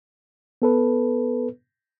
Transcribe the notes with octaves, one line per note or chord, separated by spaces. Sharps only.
B3 A4 B4